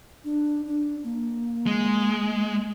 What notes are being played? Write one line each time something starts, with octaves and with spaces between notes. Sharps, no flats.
D4
D4
A#3
G#3